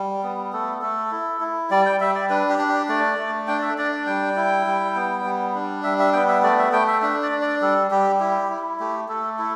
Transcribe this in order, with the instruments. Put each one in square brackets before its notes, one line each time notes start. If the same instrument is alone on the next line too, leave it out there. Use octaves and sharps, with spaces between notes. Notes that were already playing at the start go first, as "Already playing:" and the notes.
Already playing: [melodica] G3
B3
A3 A4
A3 A4
E4
E4
G3 D5
G5
G3 E5
D5
D4 B4
G4
D4
G4
A3 D5
A3
D4 G5
D5
E5
D4 D5
D5
G3 G5
E4
G3
B3
G3
D4
G3 E5
E5
B3 G5
E5
A3 D5
E5
A3 G5
E5
D4 E5
D5
D4
D5
G3 A4
G3 G4
E4 G4
E4
A3 G4
A3 A4
E4 A4